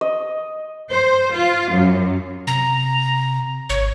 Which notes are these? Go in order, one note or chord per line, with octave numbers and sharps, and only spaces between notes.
D#5
C5
F4
F#2
C3 A#5
G#1 C#5